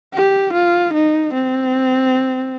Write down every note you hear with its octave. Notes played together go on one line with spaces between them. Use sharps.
G4
F4
D#4
C4